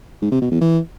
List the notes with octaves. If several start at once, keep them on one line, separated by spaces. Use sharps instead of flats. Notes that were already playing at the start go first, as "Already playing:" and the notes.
G#2
C3
B2
E2
E3